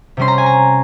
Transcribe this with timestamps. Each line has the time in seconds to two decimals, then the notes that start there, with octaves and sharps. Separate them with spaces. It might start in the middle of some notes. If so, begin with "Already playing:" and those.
0.17 C3 G3 C#4 C6
0.28 A#5
0.38 G#5
0.46 A#5